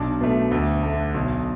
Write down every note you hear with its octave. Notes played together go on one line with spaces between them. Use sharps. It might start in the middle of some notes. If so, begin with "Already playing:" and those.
Already playing: B1 D4
B2 A3
D2
A3
D3
B1